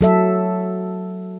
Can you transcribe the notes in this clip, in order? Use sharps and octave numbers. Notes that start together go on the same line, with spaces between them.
F#3 A4 E5